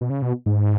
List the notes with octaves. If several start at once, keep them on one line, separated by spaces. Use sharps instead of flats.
B2
C#3
B2
G#2